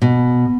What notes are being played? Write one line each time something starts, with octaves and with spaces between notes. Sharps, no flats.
B2